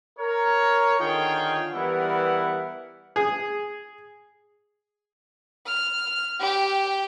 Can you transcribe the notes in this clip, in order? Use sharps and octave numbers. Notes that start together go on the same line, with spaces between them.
A#4 C#5
D3 D#3 F4 G#4 C#5 G5
E3 G3 B3 E4 A#4 F#5
G#4
F6
G4 G5